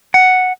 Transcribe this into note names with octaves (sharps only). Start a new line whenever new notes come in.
F#5